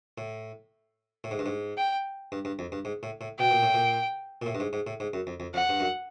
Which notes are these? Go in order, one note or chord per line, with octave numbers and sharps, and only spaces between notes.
A2
A2
G#2
G2
G#2
G5
G2
G2
F2
G2
G#2
A2
A2
B2 G5
A#2
A2
A#2
A#2
A2
G2
G#2
G#2
A2
G#2
F#2
F2
F2
F2 F#5
G2
F#2